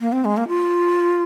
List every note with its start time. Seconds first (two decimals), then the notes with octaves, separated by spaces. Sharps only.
0.01 A#3
0.12 C4
0.25 G#3
0.37 A#3
0.48 F4